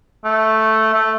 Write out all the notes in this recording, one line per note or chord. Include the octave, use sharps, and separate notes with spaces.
A3
A3